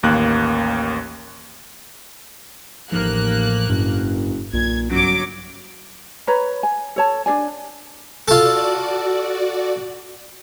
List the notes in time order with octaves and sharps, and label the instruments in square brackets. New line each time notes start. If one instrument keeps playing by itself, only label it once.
[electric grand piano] A1 D#2 A#3 F#6
[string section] A1 A#3 F#6 [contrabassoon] D#2 [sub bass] F3
[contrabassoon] F#1 [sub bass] G2
[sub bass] B1 [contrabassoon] A#2 [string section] G#6
[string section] G1 F#3 D6 [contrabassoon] F#2
[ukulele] B4 C#5 A#5 B5
G#5
A4 C#5 A5
D4 G#4 D5 G#5
[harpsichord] F4 A4 [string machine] F#4 D5